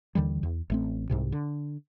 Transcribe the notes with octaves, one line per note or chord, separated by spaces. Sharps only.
D#2 D3 E3 G3
E2
A1 A3 C4
C2 G#2 C3
D3